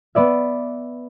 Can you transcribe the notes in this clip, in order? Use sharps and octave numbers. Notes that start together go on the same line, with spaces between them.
B3 B4 D5 E5